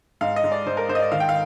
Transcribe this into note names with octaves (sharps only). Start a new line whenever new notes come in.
G#2 F5
D#5
G#2
D5
G#2 C5
A#4
G#2 C5
D#5
D5
D#3 F5
G5
F5